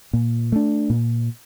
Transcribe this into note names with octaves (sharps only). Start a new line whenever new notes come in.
A#2
A3 D4
A#2